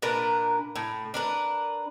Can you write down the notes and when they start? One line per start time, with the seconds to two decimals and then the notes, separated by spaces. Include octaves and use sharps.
0.02 A#2 D4 A#4 B4
0.75 A2
1.14 D4 A#4 B4